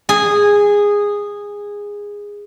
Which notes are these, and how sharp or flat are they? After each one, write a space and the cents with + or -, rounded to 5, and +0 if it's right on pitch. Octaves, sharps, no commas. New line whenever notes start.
G#4 -15